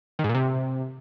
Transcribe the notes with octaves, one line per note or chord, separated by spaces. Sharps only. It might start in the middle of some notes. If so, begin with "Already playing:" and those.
D#3
G#2
A#2
C3